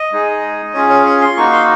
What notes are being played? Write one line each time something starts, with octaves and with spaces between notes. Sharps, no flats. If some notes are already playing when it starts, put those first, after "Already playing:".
Already playing: D#5
G#3 D#4 G#4
C#4 F4 G#4 C#5
C#5
C#5
C6
A#3 D#4 F#4 C#6
C6